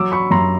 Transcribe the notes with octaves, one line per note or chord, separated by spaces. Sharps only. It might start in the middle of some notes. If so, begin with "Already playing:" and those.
Already playing: F#3 D6 E6
B5 C#6
F#2 A#5 C6